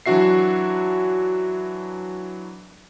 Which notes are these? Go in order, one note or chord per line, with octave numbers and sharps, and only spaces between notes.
E3 F#3 D4 F#4 E5 C7